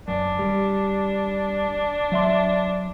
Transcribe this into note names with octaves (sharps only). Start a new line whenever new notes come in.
F#2 D4
G3
F#3 E5 C6